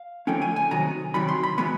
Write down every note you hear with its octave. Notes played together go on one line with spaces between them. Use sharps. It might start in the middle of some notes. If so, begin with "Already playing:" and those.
Already playing: F5
D3 F3 A3 C#4 G5
G#5
G#5
C3 D#3 F#3 A#5
C3 D#3 F#3 B5
C6
B5
E3 G#3 B3 B5